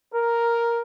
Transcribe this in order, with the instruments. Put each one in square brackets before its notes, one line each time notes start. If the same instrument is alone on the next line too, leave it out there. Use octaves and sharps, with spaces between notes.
[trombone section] A#4